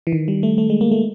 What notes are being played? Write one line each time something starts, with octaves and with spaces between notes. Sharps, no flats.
E3
D#3
G3
A3
A3
G#3
A#3
A3